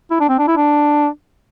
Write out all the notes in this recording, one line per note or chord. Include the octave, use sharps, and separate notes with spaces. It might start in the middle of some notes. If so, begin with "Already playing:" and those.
E4
D4
C4
D4
E4
D4